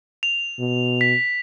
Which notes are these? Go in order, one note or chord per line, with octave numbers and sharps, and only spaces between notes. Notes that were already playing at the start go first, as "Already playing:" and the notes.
F7
B2
B6